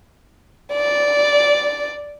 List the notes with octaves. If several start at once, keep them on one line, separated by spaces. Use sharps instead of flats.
D5